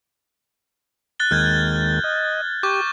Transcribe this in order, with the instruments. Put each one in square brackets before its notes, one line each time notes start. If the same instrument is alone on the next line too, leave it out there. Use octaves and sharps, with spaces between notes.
[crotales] F#6 A6 G7
[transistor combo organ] D#2 D#3 G#3 [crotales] F6 G6 G#6
[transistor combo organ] D#5
[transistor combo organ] G4 [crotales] C#6 D6 G6